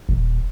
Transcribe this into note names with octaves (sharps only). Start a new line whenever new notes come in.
D#1